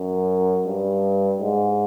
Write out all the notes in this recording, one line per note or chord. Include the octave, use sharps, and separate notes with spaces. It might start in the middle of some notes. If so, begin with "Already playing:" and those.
Already playing: F#2
G2
G#2